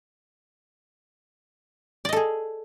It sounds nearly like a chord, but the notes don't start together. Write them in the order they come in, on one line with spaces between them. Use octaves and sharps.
D5 D#5 A4 G#4